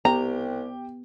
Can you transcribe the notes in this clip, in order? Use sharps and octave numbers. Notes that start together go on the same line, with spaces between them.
C2 B3 G4 G5 A#5